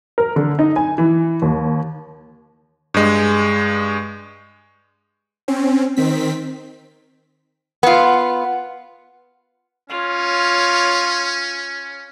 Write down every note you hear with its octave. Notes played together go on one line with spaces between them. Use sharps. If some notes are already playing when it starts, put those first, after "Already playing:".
A#4
D3
D#4
G#5
E3
D#2
G2 G#3
C4 C#4
D#3 C4 B6
B3 F4
C#4 F4 C#5